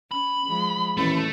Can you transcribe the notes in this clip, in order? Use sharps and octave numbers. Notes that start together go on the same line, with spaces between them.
C#4 B5
F3 G#3
A1 F2 A#2 D#3 A3